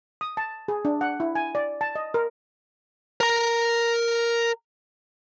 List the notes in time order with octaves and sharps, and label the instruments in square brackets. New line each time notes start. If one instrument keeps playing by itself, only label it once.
[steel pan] D#6
A5
G#4
D4
F#5
E4
G#5
D5
A5
D#5
A#4
[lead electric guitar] A#4 A#5